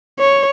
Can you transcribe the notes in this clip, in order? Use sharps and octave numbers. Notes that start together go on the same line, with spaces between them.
C#5